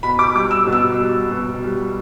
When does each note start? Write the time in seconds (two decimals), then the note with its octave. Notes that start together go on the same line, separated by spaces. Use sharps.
0.03 B2 B5
0.19 D6
0.35 G3 D6
0.51 E6
0.67 B2
0.72 E6
0.99 G3
1.31 B2
1.63 G3